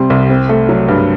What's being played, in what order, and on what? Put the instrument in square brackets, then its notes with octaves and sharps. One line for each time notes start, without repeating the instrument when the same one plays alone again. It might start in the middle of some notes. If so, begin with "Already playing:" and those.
Already playing: [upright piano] C3 G3 C4 C6
C2
C4
A3
F#3
G2